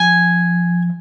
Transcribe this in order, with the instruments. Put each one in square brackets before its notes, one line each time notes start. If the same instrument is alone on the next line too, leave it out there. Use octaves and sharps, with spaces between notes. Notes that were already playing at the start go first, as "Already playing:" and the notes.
Already playing: [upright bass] F3 [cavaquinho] G#5